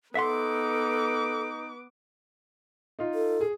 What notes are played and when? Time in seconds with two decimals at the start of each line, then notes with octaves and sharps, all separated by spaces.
0.15 B3 D#4 A4 E5 F#5 C6 D6
2.99 D#4 F4
3.14 A4
3.41 G#4